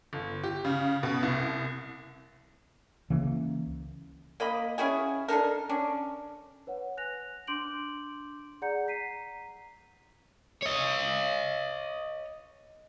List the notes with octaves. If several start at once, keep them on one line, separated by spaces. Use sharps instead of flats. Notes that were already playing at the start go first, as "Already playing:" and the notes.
G1
G4
C#3
B2
C2
C#2 C#3 E3 A#3
A#3 D#5 B5
C#4 E4 F#4 G#4
D4 D#4 A4 A#4
C#4 D4
B4 C#5 F#5
G#5 F#6 A#6 F7
D4 C6 D6 G6 D7 F#7
G#4 D5 F#5 A#5 G6 C#7
A#5 B6 C7 D#7
C#5 D#5